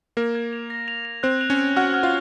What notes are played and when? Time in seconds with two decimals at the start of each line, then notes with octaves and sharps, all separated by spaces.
0.17 A#3 A#4 G#6
0.35 G#6
0.53 F7
0.70 A#6
0.88 F7
1.05 F7
1.23 C4 C5 F#6
1.41 F7
1.50 C#4 C#5
1.59 F#6
1.76 F#4 F#5 F6
1.94 F6
2.03 F4 F5